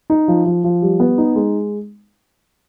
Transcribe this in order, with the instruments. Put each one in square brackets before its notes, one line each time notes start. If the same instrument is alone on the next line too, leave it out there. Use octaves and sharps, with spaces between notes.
[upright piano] D#4
F3
F3
F3
G3
B3
D#4
G#3